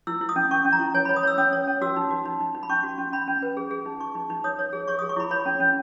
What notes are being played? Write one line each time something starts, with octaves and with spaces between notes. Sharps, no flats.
E4 E6
E4
D#6
C#4
C#4 C#6
C#4
A#5
E4
C#5 G#5
B5
C#5
D#6
C#5 E6
C#4 D#6
C#5
C#4
F#4 E6
D#4
F#4
D#4
D#4
D#4
B5
C#4 C#6
F#4
C#4
C#4 B5
C#4
B4
G#4
G#4
D#4
D#4 C#6
D#4
D#4
C#5 D#6
C#5
G#4
C#5 C#6
D#6
G#4
C#6
E4 B5
C#5 B5
C#4
C#4